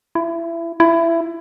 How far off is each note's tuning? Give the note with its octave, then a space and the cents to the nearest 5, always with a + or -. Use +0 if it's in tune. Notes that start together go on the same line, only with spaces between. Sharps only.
E4 +25
E4 +20